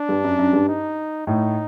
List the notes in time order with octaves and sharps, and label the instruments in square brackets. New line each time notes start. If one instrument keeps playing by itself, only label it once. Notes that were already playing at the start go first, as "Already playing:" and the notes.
Already playing: [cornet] D4
[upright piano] G2
F#2
F#2
G2
[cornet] D#4
[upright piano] A2 [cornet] D#4